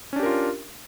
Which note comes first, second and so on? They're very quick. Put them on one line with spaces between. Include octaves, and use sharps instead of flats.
C#4 D4 G4 A#4 F4